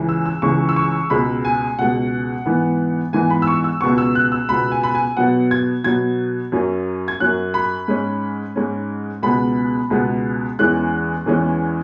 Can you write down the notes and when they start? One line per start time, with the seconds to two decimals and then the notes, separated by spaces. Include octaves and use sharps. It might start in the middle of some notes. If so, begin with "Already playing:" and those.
Already playing: C#2 C#3 E3
0.09 E6
0.26 E6
0.42 C#2 C#3 E3 C#6
0.69 E6
0.76 C#6
1.10 C#2 B2 G#3 B5
1.45 G#5
1.79 C#2 B2 G#3 F#5
2.46 G#2 E3 B3
3.13 G#2 E3 B3 G#5
3.30 B5
3.42 E6
3.47 C#6
3.64 E6
3.81 C#2 B2 B3 C#6
3.98 E6
4.15 F#6
4.32 E6
4.49 C#2 B2 B3 B5
4.72 G#5
4.83 B5
4.95 G#5
5.17 B2 F#3 B3 F#5
5.51 G#6
5.84 B2 F#3 B3 G#6
6.52 F#2 F#3 C#4
7.08 G#6
7.20 F#2 F#3 C#4 F#6
7.54 B5
7.88 G#2 G#3 C#4
8.56 G#2 G#3 C#4
9.23 C#2 B2 G#3 B3 B5
9.90 C#2 B2 G#3 B3
10.59 E2 E3 G#3 C#4 F#6
11.26 E2 E3 G#3 C#4